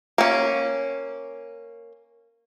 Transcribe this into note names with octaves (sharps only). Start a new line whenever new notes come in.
A#3 C#4